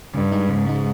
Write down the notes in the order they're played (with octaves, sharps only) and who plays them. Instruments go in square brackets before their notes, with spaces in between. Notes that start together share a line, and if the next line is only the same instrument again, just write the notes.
[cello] G2 [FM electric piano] C#3
[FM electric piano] G#3 D#4
[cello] G#2 [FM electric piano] C#3
[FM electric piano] G#3 D#4